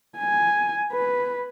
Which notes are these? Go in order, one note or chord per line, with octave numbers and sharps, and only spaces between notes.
G#5
B4